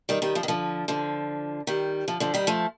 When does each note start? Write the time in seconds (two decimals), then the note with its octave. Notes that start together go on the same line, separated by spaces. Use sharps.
0.09 D#3 G3
0.22 D#3 G3
0.35 D3 F3
0.43 D#3
0.48 D3 F3
0.88 D3 F3
1.67 D#3 G3
2.08 D3 F3
2.20 D3 F3
2.34 D#3 G3
2.47 F3 A3